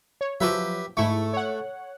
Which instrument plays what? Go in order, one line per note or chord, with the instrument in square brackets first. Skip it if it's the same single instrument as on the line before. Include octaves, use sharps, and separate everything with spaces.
[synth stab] C#5
[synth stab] F3 F#3 [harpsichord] G4 B4 E5
[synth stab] G#2 E4 C#6 [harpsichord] A3
[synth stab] C#5 F#5